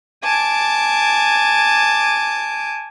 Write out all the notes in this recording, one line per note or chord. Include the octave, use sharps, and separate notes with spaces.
G#5 A5 D6